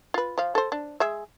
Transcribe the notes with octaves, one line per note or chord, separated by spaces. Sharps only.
F4 B4
F3 F5
A4 C5
D4
G#3 G#4 E5